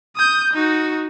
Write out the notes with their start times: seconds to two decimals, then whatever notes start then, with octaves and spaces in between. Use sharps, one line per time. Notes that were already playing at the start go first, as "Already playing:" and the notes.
0.16 D#6 G6
0.53 D#4 F#4